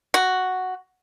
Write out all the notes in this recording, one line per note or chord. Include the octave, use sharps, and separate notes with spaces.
F#4